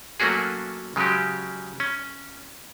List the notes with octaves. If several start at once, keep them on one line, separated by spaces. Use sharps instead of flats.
F#3 A3 A#3 C#4 F#4 G#4
C#3 F#3 G#3 C#4 G4
C#4